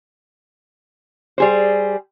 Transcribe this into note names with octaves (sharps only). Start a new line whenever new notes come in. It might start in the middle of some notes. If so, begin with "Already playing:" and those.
G3 G#4 C5